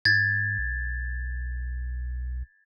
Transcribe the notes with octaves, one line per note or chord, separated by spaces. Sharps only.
G#2 G#6 A6
B1